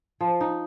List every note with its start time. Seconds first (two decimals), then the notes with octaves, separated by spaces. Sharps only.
0.20 F3
0.41 D#4